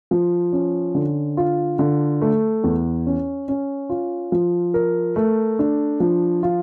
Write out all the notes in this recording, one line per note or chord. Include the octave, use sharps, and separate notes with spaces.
F3
C#4
D3
F4
D3
A3
E2
C#4
C#4
F4
F3
A#4
A3
D4
F3
F4